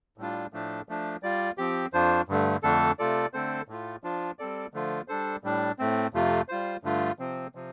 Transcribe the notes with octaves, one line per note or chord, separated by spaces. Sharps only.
A2 G3 D4 F4
A2 F3 A3 D4
F3 A3 D4
G3 F4 D5
F3 C4 G4
F2 F3 D4 F4 C5
G2 D3 A3
F2 D3 A3 D4 A4
C3 A3 F4 A4 D5
D3 A3 C4 A4 C5
A2 A3 F4
F3 D4 F4
G3 C4 A4 D5
D3 F3 A3 F4
G3 D4 A4 C5
A2 G3 D4
A2 A3 C4
F2 C3 A3 F4
G3 F4 C5
G2 D3 A3 F4
C3 F3 C4
C3 F3